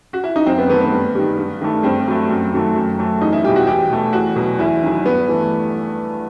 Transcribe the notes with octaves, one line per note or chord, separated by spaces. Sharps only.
F#4
E4
D#4
F#2 C4
B3
D#3 A3 B3
B3
G2
D#3 G3
G2
D#3 A3
G2 C4
F#3 A3
F#2
D#3 F#3 A3
F#2
F#3 A3
E2 D#4
E4
B2 G3 G4
F#4
E2 G4
B2 A3
E2 F#4
B2 F#3
E2 E4
D#3 F#3
G2 B3
E3 A3